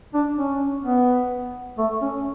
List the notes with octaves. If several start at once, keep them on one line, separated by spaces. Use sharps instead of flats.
D4
C#4
B3
A3
C#4